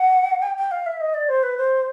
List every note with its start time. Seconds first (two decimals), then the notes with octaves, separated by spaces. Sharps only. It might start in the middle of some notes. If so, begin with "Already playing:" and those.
Already playing: F#5
0.42 G5
0.57 G5
0.71 F5
0.86 E5
1.00 D#5
1.14 D5
1.29 C5
1.43 B4
1.58 C5